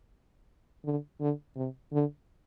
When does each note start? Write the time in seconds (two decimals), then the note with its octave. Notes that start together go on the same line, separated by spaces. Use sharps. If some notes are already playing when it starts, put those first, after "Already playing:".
0.85 D3
1.20 D3
1.56 C3
1.93 D3